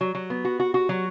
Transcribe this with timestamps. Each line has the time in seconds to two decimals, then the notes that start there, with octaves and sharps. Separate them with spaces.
0.01 F#3
0.15 F#3
0.30 B3
0.45 F#4
0.60 F#4
0.74 F#4
0.89 F#3